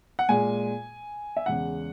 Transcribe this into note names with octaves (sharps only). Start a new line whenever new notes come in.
F#5
A#2 G#3 G#5
E5
E2 C#3 G#3 F#5